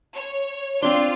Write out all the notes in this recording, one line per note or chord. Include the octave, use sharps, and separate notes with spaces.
C#5
C4 D4 F4 C6